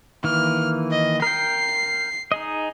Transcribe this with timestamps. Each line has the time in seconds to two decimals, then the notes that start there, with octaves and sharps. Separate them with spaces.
0.24 D#3 E3 A#3 F6
0.91 D#5
1.22 A#4 G5 C7
2.32 D#4 G#4 D#5